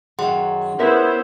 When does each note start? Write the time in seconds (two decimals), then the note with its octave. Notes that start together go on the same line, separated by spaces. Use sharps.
0.19 F#2 D#3 F#3 G#4 F#5 C6
0.79 B3 C#4 E4 A#4 C5 E5